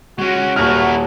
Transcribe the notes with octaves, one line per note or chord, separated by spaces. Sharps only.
G#3 C#4 F#4
D#1 E4 A#4 F6